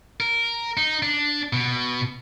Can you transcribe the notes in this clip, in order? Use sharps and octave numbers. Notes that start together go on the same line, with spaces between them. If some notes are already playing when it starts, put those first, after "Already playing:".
A#4
D#4
D4
B2